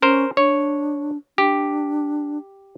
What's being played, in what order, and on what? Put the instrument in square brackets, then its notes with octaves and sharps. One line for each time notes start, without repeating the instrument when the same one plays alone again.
[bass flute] C#4 [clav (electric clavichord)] A#4 C5
[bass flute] D4 [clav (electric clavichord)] C#5
[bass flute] D4 [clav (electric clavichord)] G4